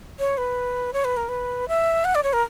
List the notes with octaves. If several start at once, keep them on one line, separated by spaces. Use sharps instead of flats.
C#5
B4
C#5
B4
A#4
B4
E5
F#5
D5
C#5
A#4